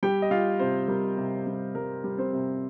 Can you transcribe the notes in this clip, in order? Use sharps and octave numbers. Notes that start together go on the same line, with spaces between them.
G3 G4 G5
D#5
G3 F4 F5
C3 C4 C5
G3 A#4
C3
G3
G3 A#4
G3
C4 C5
C3